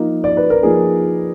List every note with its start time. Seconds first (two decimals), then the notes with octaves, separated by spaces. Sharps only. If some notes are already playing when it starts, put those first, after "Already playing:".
Already playing: F3 A#3 D#4
0.24 D5
0.37 B4
0.50 A#4
0.63 F3 A#3 D#4 G#4